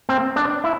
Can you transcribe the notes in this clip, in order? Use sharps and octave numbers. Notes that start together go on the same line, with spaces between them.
C4
D4
E4